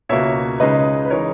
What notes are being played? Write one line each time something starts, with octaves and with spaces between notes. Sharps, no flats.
C#2 B2 A#3 C#5 E5
C#2 C#3 G#3 D#4 B4 D#5
B4
C#3 E3 G#3 D#4 A#4 C#5